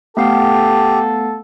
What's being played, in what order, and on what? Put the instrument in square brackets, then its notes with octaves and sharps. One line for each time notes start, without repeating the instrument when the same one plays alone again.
[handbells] A3 B3 F5 [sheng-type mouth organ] G4 [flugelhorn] A4